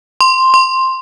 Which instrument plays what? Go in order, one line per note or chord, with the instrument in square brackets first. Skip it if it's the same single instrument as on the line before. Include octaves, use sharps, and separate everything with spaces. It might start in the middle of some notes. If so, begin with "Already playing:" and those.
[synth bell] C6
C6